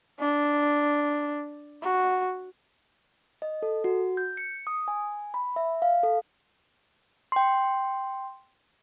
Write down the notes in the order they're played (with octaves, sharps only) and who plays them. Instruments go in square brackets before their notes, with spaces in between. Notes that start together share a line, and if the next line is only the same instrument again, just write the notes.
[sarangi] D4
F#4
[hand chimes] D#5
A4
F#4
G6
C#7
D#6
G#5
B5
E5
F5
A4
G5 C6